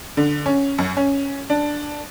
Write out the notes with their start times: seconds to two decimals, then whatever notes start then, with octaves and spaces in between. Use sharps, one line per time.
0.17 D3
0.46 C#4
0.78 F#2
0.97 C#4
1.50 D4